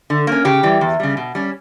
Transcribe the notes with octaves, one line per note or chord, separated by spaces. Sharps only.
D3
A#3 C#4
C#3 G4
E3 G3
E2
C#3 G3
B2
G3 C#4